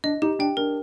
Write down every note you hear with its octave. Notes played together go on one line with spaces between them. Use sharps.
D4 D#5
D#4 G4
D4 G5
D4 A#4